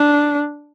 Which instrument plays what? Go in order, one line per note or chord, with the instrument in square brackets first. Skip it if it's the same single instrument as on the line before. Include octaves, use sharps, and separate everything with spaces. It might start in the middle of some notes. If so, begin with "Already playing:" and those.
Already playing: [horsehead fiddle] D4